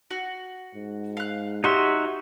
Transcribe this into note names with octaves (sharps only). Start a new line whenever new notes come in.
F#4
G#2
F5 F#6
D#4 F#4 G4 C#5 E5 C6